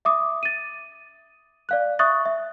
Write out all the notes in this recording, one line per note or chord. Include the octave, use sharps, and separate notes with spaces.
E5 D6 D#6
A6 D#7
D5 F5 F#6
E5 C#6 D#6 F#6 A6
E5